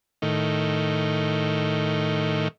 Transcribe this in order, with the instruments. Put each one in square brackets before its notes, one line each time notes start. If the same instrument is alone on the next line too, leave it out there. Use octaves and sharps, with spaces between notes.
[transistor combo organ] A2 D#3